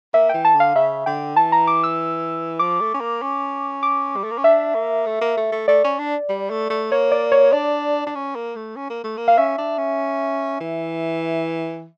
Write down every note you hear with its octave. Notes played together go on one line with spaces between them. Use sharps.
A#3 E5
E3 G5
A5
D3
F5
C#3 E5
D3 G5
E3 A5
A#5
D6
E6
F3 D6
A3
C#4
A#3
C#4
D6
G3
A3
A#3
C#4
D4 E5
A#3
A3
A#3
A3
A3
A3 D5
C#4
D4
G3
A3
A3
A#3 C#5
D5
C#5
D4 D5
D4
C#4
A#3
A3
C#4
A#3
A3
A#3
F5
C#4 E5
D4
C#4
E3